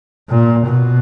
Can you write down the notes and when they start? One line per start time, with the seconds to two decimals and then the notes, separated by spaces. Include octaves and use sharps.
0.30 A#2
0.67 B2